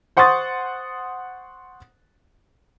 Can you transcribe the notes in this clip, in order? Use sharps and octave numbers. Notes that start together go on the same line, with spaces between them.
C5 F#5 C6 C#6 D#6 A6